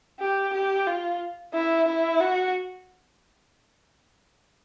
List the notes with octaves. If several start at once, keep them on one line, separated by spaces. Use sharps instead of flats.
G4
G4
F4
E4
E4
F#4